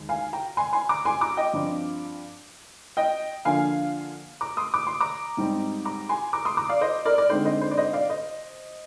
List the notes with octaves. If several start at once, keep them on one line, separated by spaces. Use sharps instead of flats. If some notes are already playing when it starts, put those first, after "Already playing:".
Already playing: D#2 D#3 G#3
F5 G#5
G5 A#5
G#5 C6
G#5 C6
A#5 D6
G#5 C6
A#5 D6
D#5 G5
G2 F3 C4 F4
D#5 G5
D3 F3 A#3 D4 F4 F5 G#5
A#5 D6
C6 D#6
D6
C6
A#5 D6
G#2 G3 C4 D#4
A#5 D6
G#5 C6
A#5 D6
C6 D#6
A#5 D6
D5 F5
C5 D#5
A#4 D5
D5
D3 G#3 C4 D#4 C5
C5 D#5
C5
D5
C5 D#5
D5 F5
C5 D#5